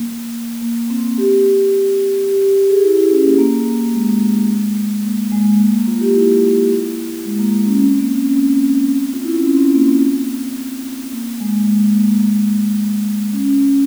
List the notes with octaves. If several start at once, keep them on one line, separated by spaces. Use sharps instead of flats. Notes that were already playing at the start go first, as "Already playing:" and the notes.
Already playing: A#3
A#3
C4
G4
G4
G4
G4
G#4
E4
E4
C#4
A#3
A#3
G#3
A#3
G#3
A#3
A#3
F4
G4
E4
G#3
A#3
C#4
C4
A#3
C#4
C4
F4
E4
C#4
C4
A#3
C4
A#3
G#3
G#3
A#3
A#3
G#3
C#4